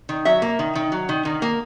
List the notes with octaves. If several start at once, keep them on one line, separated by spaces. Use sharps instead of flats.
D#3
F#3 E5
A#3
D#3
D#3
F#3
D#3
D#3
A#3